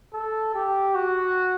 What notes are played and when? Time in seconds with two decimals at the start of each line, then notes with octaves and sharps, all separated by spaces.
0.14 A4
0.54 G4
0.95 F#4